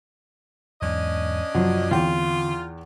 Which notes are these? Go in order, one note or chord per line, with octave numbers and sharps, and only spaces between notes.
E2 G#2 C#4 D4 D#5
F#2 C3 F3 F#3
E2 D3 C4 F4 G5